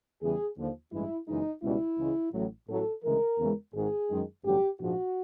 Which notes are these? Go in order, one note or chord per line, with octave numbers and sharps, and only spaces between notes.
E2 C#3 E3 G3 G#4
D#2 D3 F3
A1 G2 E3 G#3 E4
F#1 F#2 C#3 E3 G#3 D#4
C#2 B2 G3 E4
C#2 C#3 E3 G#3
A1 A2 F#3
A1 A2 F#3 A4
D2 C#3 E3 G#3 A#4
E2 C#3 E3 G#3
G#1 G#2 D#3 G#4
F#2 D#3 G#3
A1 G2 D3 F#3 G4
A#1 G#2 F3 F#4